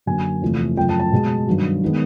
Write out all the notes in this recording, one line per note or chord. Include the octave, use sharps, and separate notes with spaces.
F#2 D3 F#3 A#3 G#5
E2 C3 F3 A3
F#2 C#3 F3 A3 G5
A5
A5
B2 G#3 B3
G2 D#3 F#3
D#3 G#3 B3